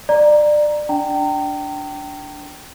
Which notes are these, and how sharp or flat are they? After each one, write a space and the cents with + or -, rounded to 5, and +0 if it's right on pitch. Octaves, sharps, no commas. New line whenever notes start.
D5 +25 A#5 +0
D4 -10 G5 -20 A#5 -30